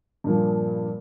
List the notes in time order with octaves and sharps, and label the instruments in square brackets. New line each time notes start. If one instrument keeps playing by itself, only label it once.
[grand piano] G2 A#2 F3